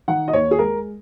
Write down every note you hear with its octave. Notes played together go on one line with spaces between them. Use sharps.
D#3 F#5
D#5
D#2 C#5
G#4
G#3 A#4